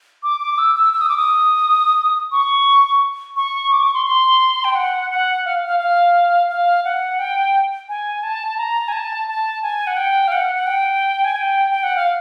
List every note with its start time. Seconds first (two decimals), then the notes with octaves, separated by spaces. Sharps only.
0.23 D6
0.40 D6
0.58 E6
0.75 E6
0.93 E6
1.01 D#6
1.09 D6
1.18 D#6
2.32 C#6
3.36 C#6
3.72 D6
3.83 C#6
3.94 C6
4.06 C6
4.64 G5
4.75 F#5
5.10 F#5
5.45 F5
5.65 F5
5.80 F5
6.49 F5
6.84 F#5
7.19 G5
7.89 G#5
8.23 A5
8.58 A#5
8.88 G#5
8.93 A5
9.28 A5
9.63 G#5
9.87 F#5
9.97 G5
10.28 F5
10.32 F#5
10.55 F#5
10.67 G5
11.24 G#5
11.36 G5
11.71 G5
11.83 F#5
11.96 F5